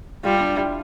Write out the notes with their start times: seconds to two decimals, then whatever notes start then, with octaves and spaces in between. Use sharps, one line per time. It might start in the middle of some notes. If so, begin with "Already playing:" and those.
0.24 G3 F4
0.40 D4
0.57 E4